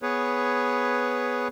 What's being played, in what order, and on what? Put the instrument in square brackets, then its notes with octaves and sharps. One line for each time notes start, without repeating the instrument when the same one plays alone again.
[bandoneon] B3 G#4 B4 C#5